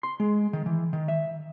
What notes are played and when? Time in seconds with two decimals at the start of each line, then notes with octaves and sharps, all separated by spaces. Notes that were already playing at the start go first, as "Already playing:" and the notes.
0.03 C6
0.20 G#3
0.53 D#3
0.66 E3
0.93 D#3
1.08 E5